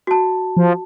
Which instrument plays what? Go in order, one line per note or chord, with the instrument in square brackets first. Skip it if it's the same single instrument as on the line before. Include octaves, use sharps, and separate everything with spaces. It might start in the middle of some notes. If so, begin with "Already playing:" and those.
[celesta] F#4 A5
[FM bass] F3